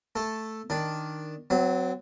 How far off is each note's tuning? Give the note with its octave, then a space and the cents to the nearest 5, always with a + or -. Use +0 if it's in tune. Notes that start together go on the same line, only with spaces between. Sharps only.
A3 +0 A4 +0
D#3 +0 D4 +0
F#3 +0 C4 -35